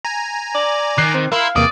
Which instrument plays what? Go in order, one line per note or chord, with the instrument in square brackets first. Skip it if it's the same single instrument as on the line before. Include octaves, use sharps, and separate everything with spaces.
[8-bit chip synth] G#5 A#5
[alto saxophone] D5
[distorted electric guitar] D#3 [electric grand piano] D6 F#6 C7
[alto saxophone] C4
[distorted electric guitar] E4 [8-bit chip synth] A#4 C6 [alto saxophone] F5
[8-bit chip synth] E2 C3 A#3 [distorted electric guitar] D5 [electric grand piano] D#6